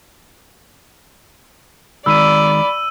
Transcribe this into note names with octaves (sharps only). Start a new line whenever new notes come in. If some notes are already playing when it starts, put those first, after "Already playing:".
D#3 G#3 D5 B5 E6 D#7